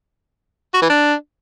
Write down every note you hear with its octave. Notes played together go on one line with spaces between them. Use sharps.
F#4
E3
D4